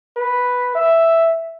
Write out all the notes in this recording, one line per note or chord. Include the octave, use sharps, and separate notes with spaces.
B4
E5